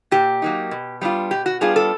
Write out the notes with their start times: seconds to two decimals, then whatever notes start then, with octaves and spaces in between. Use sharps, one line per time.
0.11 A#2 G4
0.42 F#3 A#3 D#4
0.71 B2
1.01 G3 B3 D4 F4
1.31 B2 G4
1.46 F#4
1.61 G3 B3 D4 F4 G#4
1.76 A4